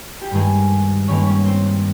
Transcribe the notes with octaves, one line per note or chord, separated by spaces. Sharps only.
G4
G2 D#3 G#3 A#3 G#4
G2 D#3 A#3 C#4 C#5
C#4 C#5
C4 C5